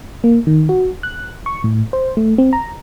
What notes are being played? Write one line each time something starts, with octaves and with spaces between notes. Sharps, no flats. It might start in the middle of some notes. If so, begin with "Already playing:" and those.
A#3
D#3
F#4
F#6
C#6
A2
C5
A3
C4
A#5